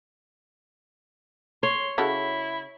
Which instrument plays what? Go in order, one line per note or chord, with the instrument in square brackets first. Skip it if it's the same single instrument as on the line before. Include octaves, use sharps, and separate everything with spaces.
[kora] C#5 [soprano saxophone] C6
[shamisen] C#3 F#4 A4 [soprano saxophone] E4